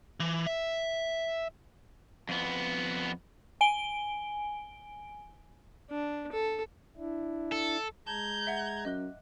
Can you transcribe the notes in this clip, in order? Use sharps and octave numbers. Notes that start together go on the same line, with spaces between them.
E3
E5
F2 B3
G#5 D7 G7
D4
A4
D4 E4
A4
G#3 A5 A#5 G6 G#6
E5 F#5
F#2 D#5 D6 F#6